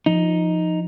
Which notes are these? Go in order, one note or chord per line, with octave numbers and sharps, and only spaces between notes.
F3 D#4